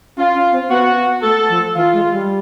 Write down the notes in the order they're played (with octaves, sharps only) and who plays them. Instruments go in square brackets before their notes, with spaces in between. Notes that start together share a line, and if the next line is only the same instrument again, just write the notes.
[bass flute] C#4 [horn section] F4
[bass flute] C#4
C4
[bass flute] B3 [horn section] F#4
[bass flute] A3 [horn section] A4
[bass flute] F3
[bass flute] E3 [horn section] F4
[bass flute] G#3
G3